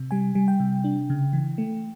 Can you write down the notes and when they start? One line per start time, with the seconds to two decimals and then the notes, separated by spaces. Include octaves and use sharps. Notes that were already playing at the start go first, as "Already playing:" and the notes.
Already playing: C3
0.11 G3 G#5
0.35 G3
0.48 G5
0.60 C3
0.84 D4
1.10 C#3
1.33 E3
1.58 A3